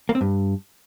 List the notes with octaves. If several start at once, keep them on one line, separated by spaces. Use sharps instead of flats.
A#3
C4
G2